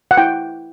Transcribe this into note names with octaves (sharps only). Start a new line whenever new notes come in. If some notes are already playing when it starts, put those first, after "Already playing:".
F#5
E4 G5